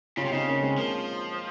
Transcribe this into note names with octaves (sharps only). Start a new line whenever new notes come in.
C#3 C#4 F4
C3
C#3 C4 D#4
A#3 C#4
G#3 C4
F3 A#3